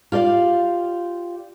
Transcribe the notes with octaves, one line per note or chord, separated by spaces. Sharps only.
F4 G4 D5 F5